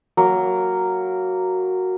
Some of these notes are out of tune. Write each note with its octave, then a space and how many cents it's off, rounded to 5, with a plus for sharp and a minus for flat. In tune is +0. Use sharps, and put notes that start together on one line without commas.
F#3 +0 A#3 -10